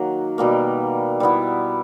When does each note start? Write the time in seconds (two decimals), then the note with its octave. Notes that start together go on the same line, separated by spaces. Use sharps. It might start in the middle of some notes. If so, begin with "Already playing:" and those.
Already playing: D#3 F#3 A#3
0.38 B2 G3 A#3
1.20 G3 B3 E4